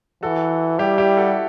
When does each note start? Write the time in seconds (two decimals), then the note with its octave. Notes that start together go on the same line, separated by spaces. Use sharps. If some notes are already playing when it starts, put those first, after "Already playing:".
0.23 E3 F#4 A4
0.79 G3 E4 G4
0.98 E4 G4
1.17 F#4 A4